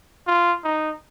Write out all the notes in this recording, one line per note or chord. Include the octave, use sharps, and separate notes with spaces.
F4
D#4